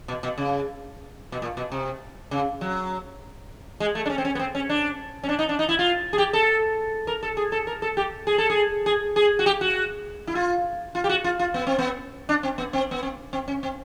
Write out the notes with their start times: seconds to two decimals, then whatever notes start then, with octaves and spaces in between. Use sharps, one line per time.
0.08 B2
0.23 B2
0.38 C#3
1.32 B2
1.42 A#2
1.57 B2
1.72 C3
2.31 C#3
2.61 F#3
3.80 G#3
3.95 A3
4.06 D4
4.10 C#4
4.18 C4
4.25 C#4
4.35 B3
4.39 C4
4.55 C#4
4.69 D4
5.23 C#4
5.29 D4
5.39 D#4
5.49 D4
5.59 D#4
5.69 E4
5.79 F4
6.13 G#4
6.18 G4
6.33 A4
7.07 A#4
7.23 A4
7.37 G#4
7.52 A4
7.67 A#4
7.82 A4
7.97 G4
8.27 G#4
8.38 A4
8.50 G#4
8.86 G#4
9.16 G#4
9.39 F#4
9.46 G4
9.61 F#4
10.27 E4
10.35 F4
10.95 F4
11.04 G4
11.09 F#4
11.24 F4
11.39 F4
11.54 B3
11.67 C4
11.79 B3
12.29 D4
12.43 C4
12.58 B3
12.73 C4
12.91 B3
13.03 C4
13.33 C4
13.48 C#4
13.63 C4